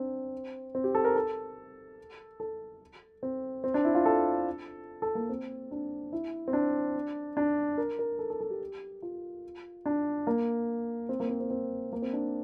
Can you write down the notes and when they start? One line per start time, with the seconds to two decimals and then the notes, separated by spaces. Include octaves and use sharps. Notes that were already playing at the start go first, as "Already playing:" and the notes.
Already playing: C4 D4
0.75 C4
0.84 G4
0.95 A4
1.05 A#4
1.15 A4
2.40 A4
3.23 C4
3.64 C4
3.74 D4
3.85 E4
3.95 F4
4.06 A4
5.02 A4
5.15 A#3
5.29 C4
5.71 D4
6.13 E4
6.48 C4
6.53 D4
7.37 D4
7.78 A#4
7.99 A#4
8.19 A4
8.30 A4
8.41 A4
8.50 G4
9.02 F4
9.86 D4
10.27 A#3
11.09 C4
11.20 A#3
11.29 C4
11.40 C4
11.50 C4
11.93 A#3
12.02 C4
12.13 D4